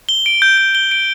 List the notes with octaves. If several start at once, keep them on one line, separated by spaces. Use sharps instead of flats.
G7
D7
G6
G6
G7
D7